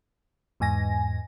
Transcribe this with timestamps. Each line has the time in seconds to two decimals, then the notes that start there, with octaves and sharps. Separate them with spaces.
0.60 E2 G#2 G#5 A#6